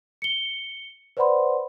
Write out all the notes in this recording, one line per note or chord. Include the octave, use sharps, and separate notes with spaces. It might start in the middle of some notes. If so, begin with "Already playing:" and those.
C#7 G7
B4 C5 D5 F#5 B5 C6